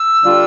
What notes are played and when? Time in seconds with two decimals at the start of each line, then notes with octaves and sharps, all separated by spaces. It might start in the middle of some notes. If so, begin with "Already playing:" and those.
Already playing: E6
0.23 D3 G3 D4 F4 A4